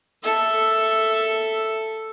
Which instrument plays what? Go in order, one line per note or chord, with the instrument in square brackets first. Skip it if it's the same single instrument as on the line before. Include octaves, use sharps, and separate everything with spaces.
[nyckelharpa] A4 E5